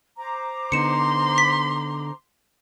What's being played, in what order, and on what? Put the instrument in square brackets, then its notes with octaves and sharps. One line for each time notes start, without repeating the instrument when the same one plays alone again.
[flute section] C5 A#5 D6
[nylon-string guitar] D3 B3 D#4 [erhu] C6 [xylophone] C#7 E7
[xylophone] B6